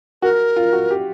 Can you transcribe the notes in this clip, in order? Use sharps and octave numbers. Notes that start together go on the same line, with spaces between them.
F#4 A#4
F4
F#4
G4